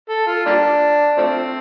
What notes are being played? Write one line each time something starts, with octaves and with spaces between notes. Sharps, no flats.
A4
F4
G3 A#3 D4
F3 A3 C4